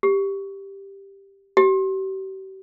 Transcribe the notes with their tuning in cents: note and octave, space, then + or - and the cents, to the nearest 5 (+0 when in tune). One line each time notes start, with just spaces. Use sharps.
G4 +5
G4 -40